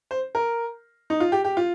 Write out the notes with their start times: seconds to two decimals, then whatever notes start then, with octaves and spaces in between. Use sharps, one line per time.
0.11 C5
0.35 A#4
1.10 D#4
1.20 F4
1.32 G4
1.44 G4
1.57 F4